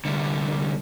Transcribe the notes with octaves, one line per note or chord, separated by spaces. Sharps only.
C2 D3